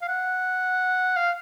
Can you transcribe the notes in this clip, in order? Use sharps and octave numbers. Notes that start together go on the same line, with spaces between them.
F5
F#5
F5